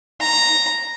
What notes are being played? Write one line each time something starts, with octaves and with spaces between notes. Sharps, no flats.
A#5